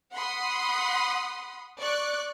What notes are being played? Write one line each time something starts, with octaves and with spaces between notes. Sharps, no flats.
F#5 B5 C6 D#6
D5 C#6 F#6